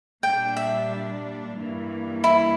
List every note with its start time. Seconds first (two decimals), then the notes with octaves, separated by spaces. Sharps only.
0.23 A#2 G3 D4 G5
0.57 E5
1.57 G2 E3 A#3
2.24 E4